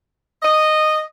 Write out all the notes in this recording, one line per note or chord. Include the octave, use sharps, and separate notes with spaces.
D#5